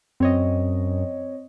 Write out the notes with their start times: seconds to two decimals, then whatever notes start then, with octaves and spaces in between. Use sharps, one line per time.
0.20 F#2 C4 C#5 D#5